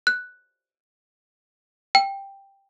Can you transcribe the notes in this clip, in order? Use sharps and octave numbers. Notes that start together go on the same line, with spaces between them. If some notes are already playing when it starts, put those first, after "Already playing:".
F#6
G5